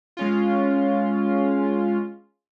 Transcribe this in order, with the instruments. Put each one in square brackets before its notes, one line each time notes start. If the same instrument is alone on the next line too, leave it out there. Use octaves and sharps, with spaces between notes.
[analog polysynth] G#3 C#4 F4